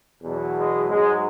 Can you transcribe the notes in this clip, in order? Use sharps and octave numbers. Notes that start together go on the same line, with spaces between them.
E2 B2 F#3
G#3
G#2 F#3 G#3